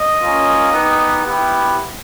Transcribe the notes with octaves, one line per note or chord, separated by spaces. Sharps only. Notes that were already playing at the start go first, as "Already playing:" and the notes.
Already playing: D#5
A#3 C#4 F4
B3 D#4 G4
B3 E4 G4